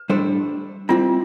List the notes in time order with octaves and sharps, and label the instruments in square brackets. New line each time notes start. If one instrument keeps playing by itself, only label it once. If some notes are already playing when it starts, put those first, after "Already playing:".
Already playing: [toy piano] B4
[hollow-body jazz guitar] A2 G3 D4 A4 C5
[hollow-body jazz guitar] G3 C4 E4 [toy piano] F4